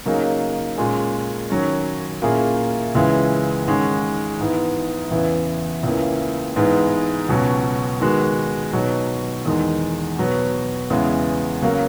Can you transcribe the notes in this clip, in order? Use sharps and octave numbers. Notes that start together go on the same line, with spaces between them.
C#3 F#3 A#3 D#4 G#4
A#2 G#3 C#4 G#4
D#3 F#3 C#4
A#2 A#3 C#4 E4 G#4
C#2 C#3 E3 G#3
G#2 D#3 G#3 C#4
G#2 E3 B3 E4
E2 C#3 E3 B3 E4
C#2 C#3 E3 A#3
G#2 E3 G#3 B3
C#2 B2 F#3 C#4
D#3 G#3 B3 F#4
B2 F#3 B3 D#4
E2 D#3 G#3 D#4
B2 F#3 B3
E2 C#3 E3 G#3 B3
C#3 F#3 A#3